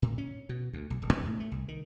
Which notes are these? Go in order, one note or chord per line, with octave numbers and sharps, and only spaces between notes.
A2
C#4
B2
D2
B1
D#1
E2
A2
A3
C2
D#3